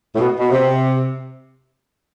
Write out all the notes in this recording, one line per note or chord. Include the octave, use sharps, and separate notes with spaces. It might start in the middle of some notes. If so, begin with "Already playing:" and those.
A2
B2
B2
C3